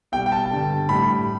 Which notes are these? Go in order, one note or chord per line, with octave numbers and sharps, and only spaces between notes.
B2 G3 G5
G5
A5
G2 D3 G3
A2 G3 B5